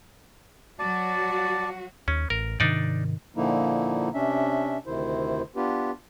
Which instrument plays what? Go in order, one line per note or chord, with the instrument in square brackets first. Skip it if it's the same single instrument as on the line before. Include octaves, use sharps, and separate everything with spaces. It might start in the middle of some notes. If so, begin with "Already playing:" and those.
[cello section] F#3 F#4 [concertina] D5 A5
[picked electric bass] D#2 [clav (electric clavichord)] C#4
[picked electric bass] A1 [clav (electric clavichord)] A#4
[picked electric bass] G#2 C3 D#3 [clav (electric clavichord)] D4 D#4 D5
[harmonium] A#2 D3 F3 A#3 D#4 E4
C3 C#4 D4 E5
D2 C3 D#3 E4 C5
B3 D4 F4 G4 B4